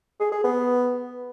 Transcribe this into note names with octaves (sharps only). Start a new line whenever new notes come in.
G#4
G#4
B3